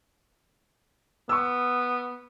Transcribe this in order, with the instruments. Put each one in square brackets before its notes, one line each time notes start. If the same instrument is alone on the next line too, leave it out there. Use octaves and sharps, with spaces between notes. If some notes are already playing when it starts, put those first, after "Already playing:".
[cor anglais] B3 [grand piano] C#6 E6